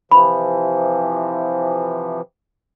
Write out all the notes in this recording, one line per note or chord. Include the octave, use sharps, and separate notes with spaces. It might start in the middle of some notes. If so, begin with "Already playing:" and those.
C3 E3 F3 B5